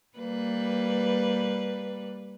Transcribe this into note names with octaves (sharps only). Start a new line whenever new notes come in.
G3 A#3 B4